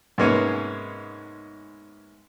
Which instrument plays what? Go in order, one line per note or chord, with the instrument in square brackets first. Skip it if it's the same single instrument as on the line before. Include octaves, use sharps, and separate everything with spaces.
[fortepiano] G#2 C3 G#3 A#3 B3 C#4